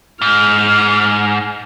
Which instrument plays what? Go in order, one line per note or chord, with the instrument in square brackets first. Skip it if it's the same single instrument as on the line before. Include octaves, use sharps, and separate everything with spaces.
[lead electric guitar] G#2 [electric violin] F6